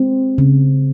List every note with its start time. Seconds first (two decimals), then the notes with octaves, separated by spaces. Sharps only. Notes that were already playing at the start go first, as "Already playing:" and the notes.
Already playing: G#3 C4
0.38 C#3